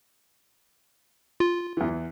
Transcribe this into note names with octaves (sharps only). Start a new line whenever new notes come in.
F4
E2 E3